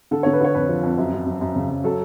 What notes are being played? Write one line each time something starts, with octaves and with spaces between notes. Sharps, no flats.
D3 A4
D3 C#5
B4
D3 C#5
F2 B4
F3
F2
F#2
F#2
F#2
F#2
C#3
F#2
F#3 A4